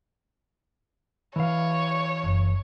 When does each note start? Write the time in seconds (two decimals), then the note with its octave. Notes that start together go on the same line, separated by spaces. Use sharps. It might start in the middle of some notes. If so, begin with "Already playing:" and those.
1.36 E3 C#5 F5
2.23 F#1